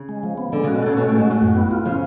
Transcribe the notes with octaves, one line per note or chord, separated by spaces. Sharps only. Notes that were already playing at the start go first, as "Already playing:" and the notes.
Already playing: C#3
G#3
F3
B3
D3 G#3
C#3 F#4
B2
C#3 A4
B2 C#4
A2 G#3
G#2
A2 F#4
F#2
B3
F4
C#3 F3